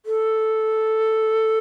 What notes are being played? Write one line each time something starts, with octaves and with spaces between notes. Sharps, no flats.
A4